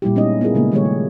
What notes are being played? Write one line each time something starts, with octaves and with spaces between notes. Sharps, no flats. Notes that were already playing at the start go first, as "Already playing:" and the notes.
A#2 G3 E4 G4
G#3 B3 C#4 D#4 E4 D#5
B3 E4 F4 G#4 A#4
C#3 G#3 A#3 B3
D#3 G3 A3 G4 G#4 C#5
F4